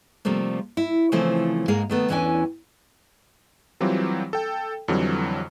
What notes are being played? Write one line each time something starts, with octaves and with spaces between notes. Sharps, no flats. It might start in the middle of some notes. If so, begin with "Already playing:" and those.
C3 F3 G3 A3 A#3
E4
C#3 E3 F3 A3 C4 C5
G#2 G#3 A#3 G#4 F5
D#3 A3 B3
E2 E3 C#4 D4 E5 G#5
E3 F#3 G3 C4 F4 G4
A4 G5
F2 D3 E3 F#3 G3